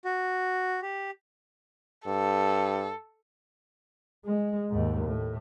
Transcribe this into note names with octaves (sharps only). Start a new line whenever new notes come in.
F#4
G4
G2 A4
G#3
D#2 G#2
A2